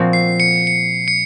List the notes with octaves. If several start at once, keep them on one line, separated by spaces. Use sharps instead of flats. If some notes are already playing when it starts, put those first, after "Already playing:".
Already playing: A#2 F3 C4 F#4
C7
C#7
C#7
C#7